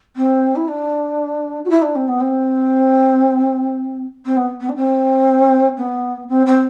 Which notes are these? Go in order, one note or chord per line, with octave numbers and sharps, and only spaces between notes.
C4
E4
D4
F#4
E4
D4
C4
B3
C4
C4
B3
B3
D4
C4
B3
C4
C4